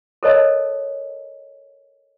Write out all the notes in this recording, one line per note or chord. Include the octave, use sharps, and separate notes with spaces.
A4 A#4 C5 C#5 D#5 A5